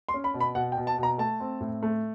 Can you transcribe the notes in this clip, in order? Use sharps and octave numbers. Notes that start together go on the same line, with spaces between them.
C6
C#4
B5
B2
B5
B2 F#5
G5
B2
A5
B2 A#5
A3 A5
C4
A2
A3